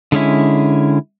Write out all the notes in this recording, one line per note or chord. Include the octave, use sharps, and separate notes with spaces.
D3 G#3 C#4 E4